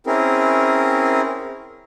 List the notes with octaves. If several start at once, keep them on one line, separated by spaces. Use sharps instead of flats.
C4 C#4 E4 G#4 A#4